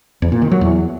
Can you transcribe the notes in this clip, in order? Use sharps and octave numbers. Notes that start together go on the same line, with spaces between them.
E2
A#2
D#3
F#3
E2